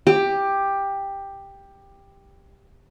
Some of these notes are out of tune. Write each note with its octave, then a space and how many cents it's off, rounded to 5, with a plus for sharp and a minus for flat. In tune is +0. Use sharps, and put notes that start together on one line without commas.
G4 +10